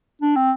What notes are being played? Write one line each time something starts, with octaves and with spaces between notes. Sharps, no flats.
D4
C4